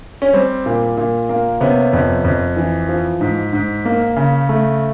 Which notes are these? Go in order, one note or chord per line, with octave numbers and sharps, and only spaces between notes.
C#4
G3 C4
A#2
A#2
A#3
C3 B3 C#4
F2
F2
E3
F3
G#2
G#2
A#3
C#3
A3